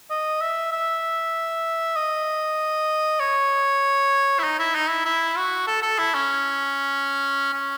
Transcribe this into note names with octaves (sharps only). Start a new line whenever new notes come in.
D#5
E5
E5
D#5
C#5
E4
D#4
E4
D#4
E4
E4
F#4
A4
A4
E4
C#4
C#4